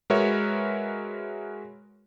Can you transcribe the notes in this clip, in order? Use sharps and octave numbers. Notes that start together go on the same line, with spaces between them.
G#3 F#4 A#4 B4 C#5 E5